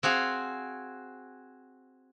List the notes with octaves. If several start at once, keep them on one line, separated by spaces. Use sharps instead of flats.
C4 F#4 G#4 F5